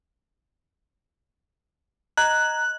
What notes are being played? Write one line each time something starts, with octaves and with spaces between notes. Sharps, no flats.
D#5 A#5 F#6 G#6